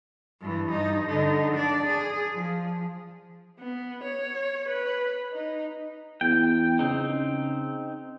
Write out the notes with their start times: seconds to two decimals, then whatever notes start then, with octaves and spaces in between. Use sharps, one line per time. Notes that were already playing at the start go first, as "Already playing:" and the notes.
0.40 G2 E3
0.70 G2 D#4
1.08 D3 D#4
1.54 D4 D5
1.85 G#4
2.33 F3
3.59 B3
4.03 C#5
4.68 B4
5.33 D#4
6.21 E2 G5
6.79 C#3 C4 D#4